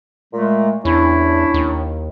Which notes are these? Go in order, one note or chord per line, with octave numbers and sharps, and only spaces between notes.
A#2 G#3 A3
E2 C#4 D4 E4
D#2